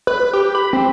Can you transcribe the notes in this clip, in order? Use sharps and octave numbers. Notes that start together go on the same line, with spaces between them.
B4
B4
G4
B5
C4